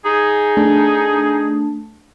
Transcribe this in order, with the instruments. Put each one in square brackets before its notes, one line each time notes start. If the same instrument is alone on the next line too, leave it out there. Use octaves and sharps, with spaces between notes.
[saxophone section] D#4 G#4
[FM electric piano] A3 D4 A5